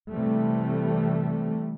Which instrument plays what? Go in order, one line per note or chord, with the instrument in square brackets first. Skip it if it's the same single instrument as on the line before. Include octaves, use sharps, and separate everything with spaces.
[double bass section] C3 E3 G3 A3